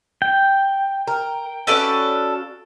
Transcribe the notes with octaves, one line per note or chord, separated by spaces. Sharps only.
G5
A#4
C#4 F#4 A4 B4 D5 F5